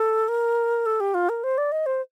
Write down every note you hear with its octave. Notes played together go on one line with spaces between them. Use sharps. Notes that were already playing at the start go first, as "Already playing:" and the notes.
Already playing: A4
A#4
A4
G4
F4
A#4
C5
D5
D#5
C5